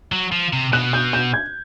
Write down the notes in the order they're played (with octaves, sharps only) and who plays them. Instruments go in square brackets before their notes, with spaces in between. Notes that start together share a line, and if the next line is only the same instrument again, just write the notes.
[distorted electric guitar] F#3
F3
C3
[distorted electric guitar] B2 [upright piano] F#6
[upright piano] G6
G6
G#6